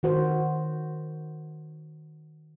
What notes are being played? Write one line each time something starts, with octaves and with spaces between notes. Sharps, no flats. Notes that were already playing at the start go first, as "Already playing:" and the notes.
D#3 F#4 C5